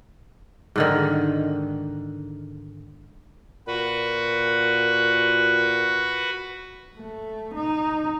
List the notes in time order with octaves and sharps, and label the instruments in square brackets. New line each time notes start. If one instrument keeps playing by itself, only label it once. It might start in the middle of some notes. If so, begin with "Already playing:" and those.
[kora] G#2 D3 D#3
[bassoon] A#2 [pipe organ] F#4 B4
[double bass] A3
D#4